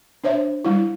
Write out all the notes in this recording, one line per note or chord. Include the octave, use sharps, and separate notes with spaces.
D4 C5 C#5 E5
G3 E4